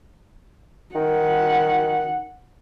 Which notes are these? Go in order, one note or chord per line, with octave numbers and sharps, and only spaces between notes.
D#3 F#5